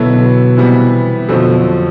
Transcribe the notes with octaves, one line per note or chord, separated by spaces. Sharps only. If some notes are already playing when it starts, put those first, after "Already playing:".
Already playing: B2 D3 F#3 B3 E4 A4
C3 E3 G3 B3
F2 B2 D3 F#3 A3 C4